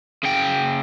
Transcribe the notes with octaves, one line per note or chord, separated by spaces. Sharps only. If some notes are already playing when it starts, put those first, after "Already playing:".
C#3 G5